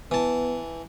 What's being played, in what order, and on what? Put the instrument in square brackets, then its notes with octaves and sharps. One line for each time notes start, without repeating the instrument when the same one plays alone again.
[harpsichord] E3 A5 [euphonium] B3